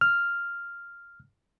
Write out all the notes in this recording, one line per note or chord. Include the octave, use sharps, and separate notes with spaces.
F6